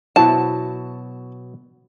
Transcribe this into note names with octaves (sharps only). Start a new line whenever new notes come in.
B2 F#3 E4 F#4 C5 A5